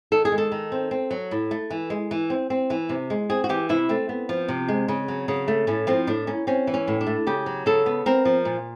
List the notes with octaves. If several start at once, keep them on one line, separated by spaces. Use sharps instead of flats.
D#3 A4
G#4
G#3
A4
D#3
C4
C4
F#3
A2
A3
E3
G#3
E3
C4
C4
E3
C3
G#3
C4 G#4
F#4
E3 G4
C3 E4
A3 C4
B3
F3
C3
G#3
C#3
F#3
C#3
A3
A2 C#4
F3 C4
A2 D4
A#3 C#4
C4 C#4
E3
C#4
A2
D4
A3
C#3 G4
F#3
C#3 A4
B3
C4 A#4
F3
A#2